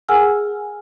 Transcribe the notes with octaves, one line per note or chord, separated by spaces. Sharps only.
G#4 A#4 F#5 G#5 E6 F6